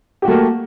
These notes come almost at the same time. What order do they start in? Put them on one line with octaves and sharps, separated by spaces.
G4 F#4 A3 A#3